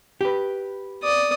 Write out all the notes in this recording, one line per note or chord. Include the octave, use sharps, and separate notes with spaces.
G4 B4
D5 D#6